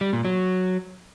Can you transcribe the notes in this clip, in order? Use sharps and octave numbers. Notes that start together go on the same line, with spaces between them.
G3
A#2
F#3